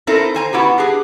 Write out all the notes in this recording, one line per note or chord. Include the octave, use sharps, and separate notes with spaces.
C4 D#4 E4 A4 A#4
C5 G#5 A#5
B3 E4 F#4 G4
D4 G4 G#4